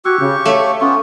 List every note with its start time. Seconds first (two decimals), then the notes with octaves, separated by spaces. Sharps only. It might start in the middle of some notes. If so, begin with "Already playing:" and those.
0.05 F#4 G4 C#6 E6 F#6 G#6
0.20 C#3 G6
0.45 A3 C#5 F5
0.81 B3 C#4 F4 C#6 D6